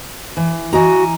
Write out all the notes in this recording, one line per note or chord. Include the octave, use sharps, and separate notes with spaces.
E3
E3 F#4 D#5 A#5